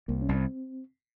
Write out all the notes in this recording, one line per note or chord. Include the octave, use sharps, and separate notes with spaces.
C2 A#3
C#4
C2
C4